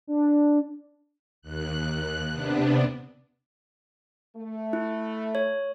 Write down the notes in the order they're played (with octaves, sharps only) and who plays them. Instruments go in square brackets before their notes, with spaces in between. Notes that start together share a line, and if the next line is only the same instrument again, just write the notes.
[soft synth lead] D4
[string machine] D#2 F#6
C3 B3 D4
[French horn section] A3
[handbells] E4
C#5